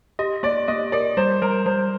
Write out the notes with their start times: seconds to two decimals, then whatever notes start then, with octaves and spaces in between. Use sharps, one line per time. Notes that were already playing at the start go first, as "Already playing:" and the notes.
0.19 G4 D#5
0.43 A#3 D5
0.68 A#3 D#5
0.92 A#4 D5
1.17 G3 C5
1.42 G3 A#4
1.66 G3 C5